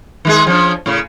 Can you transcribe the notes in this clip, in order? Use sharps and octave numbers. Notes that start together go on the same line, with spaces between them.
D#3 G#3 G#4
F3 C#4 D4
A2 C#3